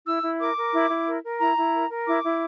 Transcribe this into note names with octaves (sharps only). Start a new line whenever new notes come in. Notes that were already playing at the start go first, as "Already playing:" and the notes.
E4 E6
E4
A#4 D6
A#4
E4
E4
A#4
A#4
E4 A#5
E4
A#4
A#4
E4 D6
E4